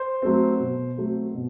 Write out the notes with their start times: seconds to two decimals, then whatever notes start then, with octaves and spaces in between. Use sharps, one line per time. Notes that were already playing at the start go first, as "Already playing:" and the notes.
Already playing: C5
0.22 F#3 A3 C4
0.60 B2
0.97 F#3 A3 C4
1.34 B2